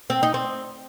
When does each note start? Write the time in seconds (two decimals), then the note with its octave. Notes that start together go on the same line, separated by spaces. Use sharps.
0.10 C4
0.23 D#4
0.34 C4